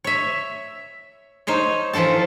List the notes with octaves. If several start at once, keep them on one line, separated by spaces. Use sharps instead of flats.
C#5 E5
D#4 C5 C#5 D#5
E3 F3 F4 A4 A5